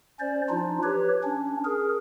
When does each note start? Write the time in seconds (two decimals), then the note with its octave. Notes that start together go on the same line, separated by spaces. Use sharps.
0.20 C#4 C5 D5
0.49 F3 D4 D#4 F4
0.83 G4 B4 C#5
1.24 C#4 D4
1.65 G#4 A#4